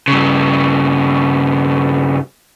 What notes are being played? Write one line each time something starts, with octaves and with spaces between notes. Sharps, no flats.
G2 C#3